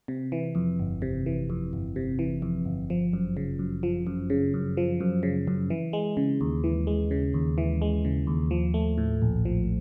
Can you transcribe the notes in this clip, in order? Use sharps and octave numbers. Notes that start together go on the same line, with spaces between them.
C3
E3
F2
G1
C3
E3
F2
G1
C3
E3
F2
G1
F3
F#2
C#3
F#2
F3
F#2
C#3
F#2
F3
F#2
C#3
F#2
E3
G#3
C#3
D#2
E3
G#3
C#3
D#2
E3
G#3
C#3
D#2
F3
A3
A2
A#1
F3